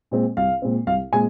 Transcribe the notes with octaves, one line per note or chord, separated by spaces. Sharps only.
A#2 G#3 C4
C2 F5
A#2 G#3 C4
C2 F5
A#2 G#3 C4 G#5